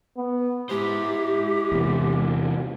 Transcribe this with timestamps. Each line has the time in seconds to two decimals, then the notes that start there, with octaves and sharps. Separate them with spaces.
0.17 B3
0.69 G#3 E4 G4 C5
1.72 E2 C3